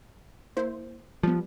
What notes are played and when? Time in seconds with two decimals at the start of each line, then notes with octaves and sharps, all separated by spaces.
0.57 A#3 E4 C5
1.23 F3 G3 B3